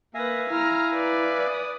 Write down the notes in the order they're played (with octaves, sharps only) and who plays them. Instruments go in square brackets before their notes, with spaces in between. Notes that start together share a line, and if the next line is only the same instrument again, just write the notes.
[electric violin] A#3 B4 [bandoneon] E5 F5 G#5 [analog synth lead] A#6
[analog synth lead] E4 [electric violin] A#5 F6
[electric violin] B4 D5
[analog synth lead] D#6